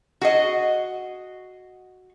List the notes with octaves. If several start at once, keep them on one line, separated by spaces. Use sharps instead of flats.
F#4 G#4 D#5